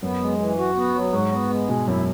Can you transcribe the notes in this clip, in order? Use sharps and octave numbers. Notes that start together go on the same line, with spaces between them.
F#2 B3
G#3
E3
F#4
B3
F#3
G#2 F#4
B3
G#3
B2 G#4
F#2 E4